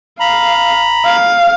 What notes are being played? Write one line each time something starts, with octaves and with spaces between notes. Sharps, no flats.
F5 A#5 B5
F5